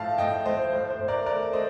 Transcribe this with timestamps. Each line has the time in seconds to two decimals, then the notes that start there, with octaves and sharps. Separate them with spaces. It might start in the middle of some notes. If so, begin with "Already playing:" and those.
Already playing: A2 F3 F5 A5
0.18 A2 D#5 G5
0.46 A2 C5 D#5
0.73 A2 C5
0.90 C5
1.00 A2
1.08 A#4 D5
1.26 A3 A#4 D5
1.53 A3 C5 D#5